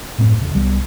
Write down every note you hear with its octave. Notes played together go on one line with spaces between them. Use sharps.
F#2 A2 A3 C4
E1 D3
C2 G3 G#3 B3